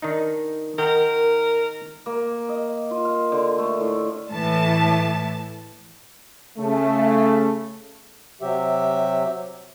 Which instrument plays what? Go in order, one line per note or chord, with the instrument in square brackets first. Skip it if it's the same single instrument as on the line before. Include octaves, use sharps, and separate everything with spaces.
[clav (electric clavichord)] D#3 D4 D#4
[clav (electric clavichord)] D#3 F#5 G5 [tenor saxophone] A#4
[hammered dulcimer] A#3
D#5
F4
F5
D3
A3
A2
[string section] A2 E3 A5
[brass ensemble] C#3 A3
[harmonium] C3 F#3 G4 E5